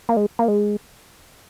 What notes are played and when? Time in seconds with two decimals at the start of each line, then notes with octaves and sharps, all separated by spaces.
0.09 A#3
0.17 G#3
0.39 A#3
0.48 G#3